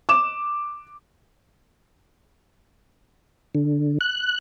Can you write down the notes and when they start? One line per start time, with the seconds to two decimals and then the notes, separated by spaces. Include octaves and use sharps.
0.09 D6 E7
3.55 D3
4.01 F#6